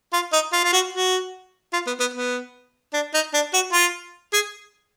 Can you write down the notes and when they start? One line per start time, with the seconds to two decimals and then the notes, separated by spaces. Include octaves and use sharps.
0.13 F4
0.33 D#4
0.53 F4
0.64 F4
0.73 F#4
0.93 F#4
1.73 F4
1.87 B3
2.00 B3
2.14 B3
2.94 D4
3.14 D#4
3.34 D4
3.54 F#4
3.73 F4
4.33 G#4